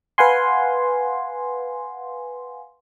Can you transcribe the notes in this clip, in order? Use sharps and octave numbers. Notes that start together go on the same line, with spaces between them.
B4 F5 F#5 G#5 C6